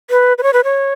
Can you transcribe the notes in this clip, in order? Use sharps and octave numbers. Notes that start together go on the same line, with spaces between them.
B4
B4
C#5
B4
C#5